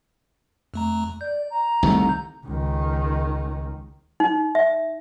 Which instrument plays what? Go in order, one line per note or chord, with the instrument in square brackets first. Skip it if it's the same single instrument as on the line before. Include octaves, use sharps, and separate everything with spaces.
[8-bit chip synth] F2 A3 A#5
[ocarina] D5 [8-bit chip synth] G6
[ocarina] A#5
[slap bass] C2 D#3 A3
[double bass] C#2 D#3
[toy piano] D#4
E5